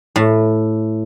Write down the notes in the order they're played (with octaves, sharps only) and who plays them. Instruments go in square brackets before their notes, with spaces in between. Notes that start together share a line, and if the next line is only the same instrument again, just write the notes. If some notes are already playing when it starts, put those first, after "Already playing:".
[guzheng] A2